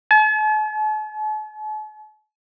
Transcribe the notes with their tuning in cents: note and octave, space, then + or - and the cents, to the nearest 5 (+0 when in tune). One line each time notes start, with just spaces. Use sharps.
A5 -45